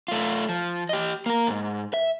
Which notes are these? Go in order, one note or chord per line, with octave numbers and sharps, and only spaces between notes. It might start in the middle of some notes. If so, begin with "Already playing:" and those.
A3 F4
F3
G4 D#5
A#3 A#4
D2 G#2
E5